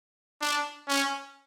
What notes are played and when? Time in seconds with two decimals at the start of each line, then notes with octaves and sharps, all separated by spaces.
0.42 D4
0.88 C#4